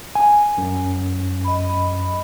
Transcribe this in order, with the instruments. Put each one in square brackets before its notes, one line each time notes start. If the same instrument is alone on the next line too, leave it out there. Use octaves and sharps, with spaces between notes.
[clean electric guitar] G#5
[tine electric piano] F#2
[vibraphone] D#5 B5